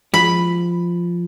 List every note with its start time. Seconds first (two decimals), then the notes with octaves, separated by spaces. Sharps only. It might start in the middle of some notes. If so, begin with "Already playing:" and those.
0.14 F3 B5